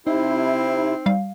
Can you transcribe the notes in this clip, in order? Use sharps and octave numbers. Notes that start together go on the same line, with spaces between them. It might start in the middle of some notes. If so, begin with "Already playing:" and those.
C3 C4 D#4 E4
G3 F5